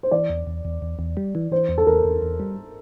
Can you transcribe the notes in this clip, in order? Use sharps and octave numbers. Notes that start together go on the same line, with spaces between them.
C5
E3 D5
E2
E2
E2
E2
E2
G3
E3
E3 C5
E2
A4
E2 A#4
E2
E2
G3